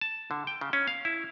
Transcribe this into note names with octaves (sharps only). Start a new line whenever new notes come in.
A5
D3
G5
C#3
C#4
F5
E4